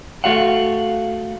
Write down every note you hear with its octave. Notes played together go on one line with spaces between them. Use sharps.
A3 F#4 F5 F#5